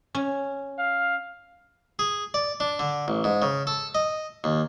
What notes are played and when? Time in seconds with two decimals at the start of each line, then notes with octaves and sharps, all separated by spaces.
0.15 C#4
0.78 F5
1.99 G#4
2.34 D5
2.60 D4
2.79 D3
3.08 A1
3.24 G#2
3.42 C#3
3.67 A4
3.95 D#5
4.44 D#2